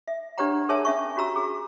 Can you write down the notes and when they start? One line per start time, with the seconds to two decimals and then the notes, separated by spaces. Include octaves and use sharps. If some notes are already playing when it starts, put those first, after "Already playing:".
0.08 E5
0.38 D4 G4 B4 C#5 F#5 A#5
0.69 G#4 A#4 C#5 E5 G#5 A5
0.85 C#4 E5 C#6
1.16 C#4 F#4 G4 A#5 E6
1.36 G#4